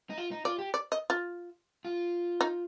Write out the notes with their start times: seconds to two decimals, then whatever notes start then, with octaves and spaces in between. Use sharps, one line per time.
0.10 D#4
0.18 F4
0.31 D#4
0.45 F4 D5
0.59 G4
0.74 D5
0.92 D#5
1.10 F4
1.85 F4
2.41 D#4